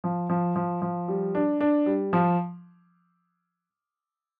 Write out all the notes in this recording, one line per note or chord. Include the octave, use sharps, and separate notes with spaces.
F3
F3
F3
F3
G3
D4
D4
G3
F3